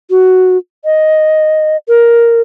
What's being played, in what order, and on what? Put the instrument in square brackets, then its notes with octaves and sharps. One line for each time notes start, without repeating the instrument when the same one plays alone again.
[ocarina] F#4
D#5
A#4